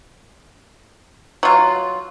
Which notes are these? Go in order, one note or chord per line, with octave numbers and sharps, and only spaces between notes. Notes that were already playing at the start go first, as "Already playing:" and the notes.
F#3 F4